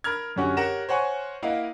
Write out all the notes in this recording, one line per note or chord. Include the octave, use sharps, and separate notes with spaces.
A#4 B5 F6 G#6
F#2 D3 C#4 F#4 G4
G4 A#4 C#5 F#5 A#6 E7
C5 C#5 F#5 G#5 C#6
A#3 E4 D#5 F5 F#5